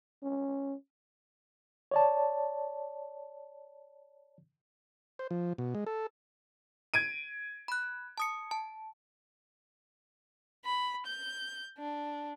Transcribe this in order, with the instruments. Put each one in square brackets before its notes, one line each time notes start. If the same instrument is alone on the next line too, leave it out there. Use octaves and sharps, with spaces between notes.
[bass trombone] C#4
[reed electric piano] C#5 D5 A5
[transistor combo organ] C5
F3
B2
G#3
A4
[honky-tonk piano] G#6 D7 D#7
[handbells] B5 F#6
A5 D#6 C#7
A5
[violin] B5
G6
D4